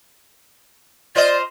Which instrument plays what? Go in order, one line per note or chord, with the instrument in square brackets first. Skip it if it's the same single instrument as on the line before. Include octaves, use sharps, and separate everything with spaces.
[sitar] F4 C5 D#5 [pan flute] D5